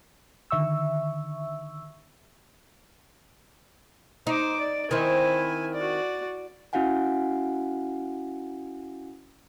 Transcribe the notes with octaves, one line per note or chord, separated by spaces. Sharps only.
D3 D#3 E5 C#6 E6
D#4 C5 D6
D5
D#3 C4 E4 G#5
F#4 D5
C#4 E4 F#4 F5 F#5 G#5